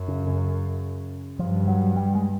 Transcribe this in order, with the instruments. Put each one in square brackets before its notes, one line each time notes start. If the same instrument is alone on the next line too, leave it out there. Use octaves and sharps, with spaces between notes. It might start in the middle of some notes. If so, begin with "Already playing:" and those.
Already playing: [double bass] F#2
[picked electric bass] C#3
C#3
[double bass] G2 [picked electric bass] F3
[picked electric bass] F#3
G3
G#3